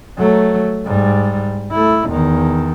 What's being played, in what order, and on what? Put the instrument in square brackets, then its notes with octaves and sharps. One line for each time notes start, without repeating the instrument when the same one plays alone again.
[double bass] F#3 A3
G#2 G3
A3 E4
E2 D#3